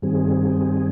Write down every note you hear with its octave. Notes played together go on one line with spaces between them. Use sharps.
G2 D#3 G3 C4 G#4